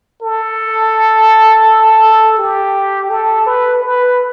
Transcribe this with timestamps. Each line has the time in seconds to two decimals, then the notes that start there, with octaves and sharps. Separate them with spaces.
0.22 A4
2.38 G4
3.10 A4
3.46 B4
3.82 B4